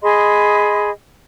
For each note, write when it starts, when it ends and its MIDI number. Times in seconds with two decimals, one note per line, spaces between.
0.02 0.90 68
0.02 0.90 75
0.02 0.90 83
0.02 0.90 84